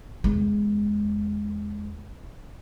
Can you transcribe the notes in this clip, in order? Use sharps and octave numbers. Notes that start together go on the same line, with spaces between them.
E2 G#3